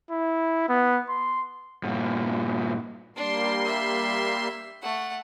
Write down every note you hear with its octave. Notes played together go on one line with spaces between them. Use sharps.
E4
B3
C6
G2 A#2
G3 A#3 D4 C6
E5
A3 F#5